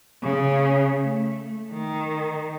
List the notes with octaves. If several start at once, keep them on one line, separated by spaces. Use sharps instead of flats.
C#3
A3
D#3